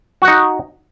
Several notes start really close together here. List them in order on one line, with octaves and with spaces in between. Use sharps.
F#4 F#5 D#4